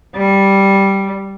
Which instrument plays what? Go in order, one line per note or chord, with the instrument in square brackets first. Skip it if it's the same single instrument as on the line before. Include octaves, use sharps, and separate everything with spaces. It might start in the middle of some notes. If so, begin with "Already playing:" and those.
[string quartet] G3